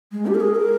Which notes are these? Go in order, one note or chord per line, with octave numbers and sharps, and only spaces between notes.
G#3
G4
A#4
G#4
A#4